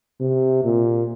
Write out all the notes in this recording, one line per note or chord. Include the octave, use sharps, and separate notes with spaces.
C3
A#2